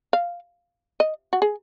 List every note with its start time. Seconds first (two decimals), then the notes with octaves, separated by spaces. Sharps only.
0.13 F5
1.00 D#5
1.33 F#4
1.42 G#4